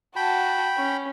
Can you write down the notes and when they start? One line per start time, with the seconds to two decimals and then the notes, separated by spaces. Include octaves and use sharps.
0.16 F#4 G5 A5 B5
0.77 C#4